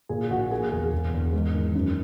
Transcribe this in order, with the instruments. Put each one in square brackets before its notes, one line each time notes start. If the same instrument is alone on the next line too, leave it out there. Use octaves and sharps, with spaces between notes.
[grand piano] A#2 G#4
A#1 F#4
A#3 G#4
E2 G#4
E1
E2
G#2
D#3
F#2